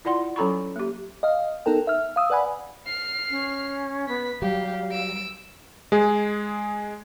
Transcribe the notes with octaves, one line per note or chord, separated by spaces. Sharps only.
E4 F4 D5 F#5 C6
F#3 C#4 A4 A#5 B5 C#6
A#3 G4
D#5 F5
B3 D#4 A4 A#4 G5
E5 F6
F5 D#6 E6
B4 D5 F#5 G#5 B5
F6 C7
C#4
B3 B6
F#3 G3 G4 F5
E6 D7
G#3 G#4